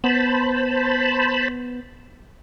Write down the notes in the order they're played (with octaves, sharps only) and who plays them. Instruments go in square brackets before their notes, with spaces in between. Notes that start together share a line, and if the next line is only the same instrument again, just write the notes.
[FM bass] B3 [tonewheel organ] C5 A5 B5